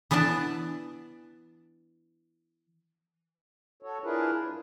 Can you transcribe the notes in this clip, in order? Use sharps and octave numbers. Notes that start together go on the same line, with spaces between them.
E3 B3 D4 D5 A5
F#4 A4 C#5
D4 E4 F4 G#4 A#4 B4
G2